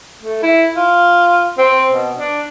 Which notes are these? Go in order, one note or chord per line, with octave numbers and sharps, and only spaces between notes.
A3
E4
F4
C4
B2
D4